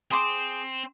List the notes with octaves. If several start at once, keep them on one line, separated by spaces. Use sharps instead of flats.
C4 G#4 C6 D6